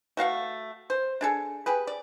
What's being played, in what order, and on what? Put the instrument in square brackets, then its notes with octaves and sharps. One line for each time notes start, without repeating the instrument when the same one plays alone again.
[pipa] A3 F#4 F5 F#5
C5
D4 G#4 A4
G4 G#4 B4
D5